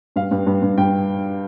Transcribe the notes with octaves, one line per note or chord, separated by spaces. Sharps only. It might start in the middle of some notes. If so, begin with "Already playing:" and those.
G2 F5
G2
G2
G2
G2 G5